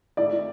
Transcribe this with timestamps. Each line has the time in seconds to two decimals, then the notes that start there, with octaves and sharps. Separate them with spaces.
0.17 A2 D5
0.33 A2